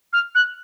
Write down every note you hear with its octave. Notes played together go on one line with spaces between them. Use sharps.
F6
F#6